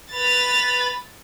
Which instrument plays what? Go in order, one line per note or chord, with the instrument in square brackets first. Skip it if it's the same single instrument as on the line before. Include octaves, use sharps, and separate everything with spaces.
[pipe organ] B4 B5 [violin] A6 F7